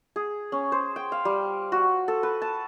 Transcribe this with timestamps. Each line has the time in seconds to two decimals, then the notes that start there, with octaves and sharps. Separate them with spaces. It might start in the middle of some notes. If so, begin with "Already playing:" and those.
0.16 G#4
0.52 C#4
0.72 C5
0.96 G5
1.12 F5
1.25 G3
1.72 F#4
2.08 A4
2.23 B4
2.42 A5